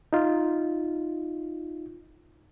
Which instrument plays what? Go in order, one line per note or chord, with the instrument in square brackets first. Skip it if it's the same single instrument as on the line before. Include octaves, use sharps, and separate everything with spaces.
[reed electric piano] D#4 F4